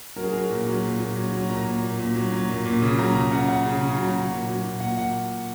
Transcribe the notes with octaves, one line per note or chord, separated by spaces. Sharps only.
F#3 A#4
G#4
F#3 A#4
A#2
F#3
A#2
A#2
F#3
F#3
A#2 A#5
A#2
A#2
A#2
F#3
F#3
A#2
A#2
C#3
F#3 A#5
C#3 A#5
C#3 F#5
C#3 F#5
C#3
C#3
F#3
F#3
A#2
F#3
A#2
A#2 F#5
A#2 F#5